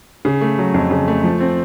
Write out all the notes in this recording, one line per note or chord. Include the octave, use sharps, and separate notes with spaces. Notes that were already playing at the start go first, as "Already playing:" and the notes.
C#3
A3
F#3
F2
C#3
A3
F3
C4